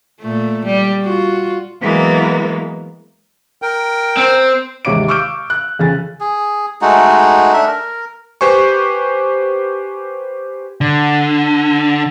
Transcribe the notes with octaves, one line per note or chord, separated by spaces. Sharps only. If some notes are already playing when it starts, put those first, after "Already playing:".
A#2 A3
G3
F4 F#4
E3 F#3 G#3 A#3 B3
A#4 G5
C4 C5
D#2 G#2 C3 C#5 D6 D7
C#6 D6 E6 F6 G6 D7
F#6
F2 C#3 G#5 A6
G#4
G#3 A3 D#4 F#4
A3 D4 E5
A#4
G4 B4 C5 G#5 C#6
D3